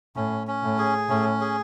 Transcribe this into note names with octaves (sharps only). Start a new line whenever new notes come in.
A2 C#4
C#4
A2
G#4
A2 C#4
G#4